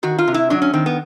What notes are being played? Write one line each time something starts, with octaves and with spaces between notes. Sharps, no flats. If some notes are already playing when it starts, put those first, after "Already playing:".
D#3 F#4
F4
C3
E4
F#3 D4
C#4
D#3 C4
B3